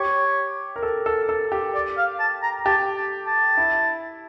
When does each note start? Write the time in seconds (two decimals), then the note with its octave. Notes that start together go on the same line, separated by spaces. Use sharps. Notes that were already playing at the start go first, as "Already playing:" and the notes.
Already playing: G4 C#5
0.76 A#4
0.83 A4
1.06 A4
1.29 A4
1.52 G4
1.74 D5
1.97 F5
2.20 A5
2.43 A#5
2.66 G4 A5
2.97 A5
3.27 A5
3.57 E4